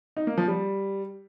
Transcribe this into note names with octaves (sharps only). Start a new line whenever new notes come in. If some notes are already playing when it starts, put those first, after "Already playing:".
D#4
A#3
F3
G3